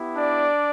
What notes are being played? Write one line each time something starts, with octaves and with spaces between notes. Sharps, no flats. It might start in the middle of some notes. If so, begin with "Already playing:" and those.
Already playing: B3 E4 G4
D4 D5